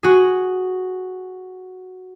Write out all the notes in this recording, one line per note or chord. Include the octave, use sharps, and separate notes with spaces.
F#4 G#4